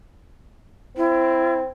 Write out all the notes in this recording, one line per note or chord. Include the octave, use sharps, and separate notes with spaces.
C4 E4